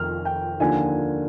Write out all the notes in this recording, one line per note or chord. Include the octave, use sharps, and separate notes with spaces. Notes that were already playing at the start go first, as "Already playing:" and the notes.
Already playing: F1 F2 D#3 F6
G5
D#2 D3 F3 G#5